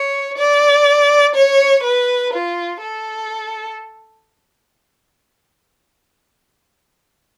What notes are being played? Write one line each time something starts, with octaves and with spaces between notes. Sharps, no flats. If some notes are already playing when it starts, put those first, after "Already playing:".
Already playing: C#5
D5
C#5
B4
F4
A4